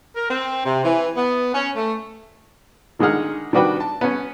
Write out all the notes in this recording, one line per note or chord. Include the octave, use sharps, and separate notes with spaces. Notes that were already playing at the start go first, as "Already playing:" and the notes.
A#4
C4
C3
E3
B3
C#4
A3
D3 D#3 G#3 G#4 F#5 F6
D#3 G3 D4 F#4 B4 G5
A5
B3 C#4